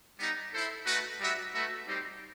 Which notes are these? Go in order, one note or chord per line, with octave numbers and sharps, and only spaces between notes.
G3 B3 D#4
E4 A4 C5
A3 D#4 F#4 B4
G3 D#4 F#4 B4 E5
A3 D#4 F#4 B4 E5
G3 C4 D#4 G4 C5